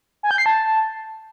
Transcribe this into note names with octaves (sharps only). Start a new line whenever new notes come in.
G#5
G6
C7
A5